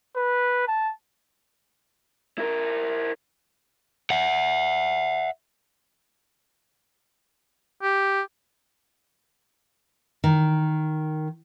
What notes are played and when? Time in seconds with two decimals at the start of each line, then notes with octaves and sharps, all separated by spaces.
0.16 B4
0.68 A5
2.38 E4 A#4
4.11 E5 F#5
7.83 G4
10.24 D#3